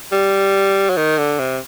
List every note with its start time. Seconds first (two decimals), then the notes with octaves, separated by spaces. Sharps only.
0.12 G3
0.90 F#3
0.97 D#3
1.18 D3
1.39 C3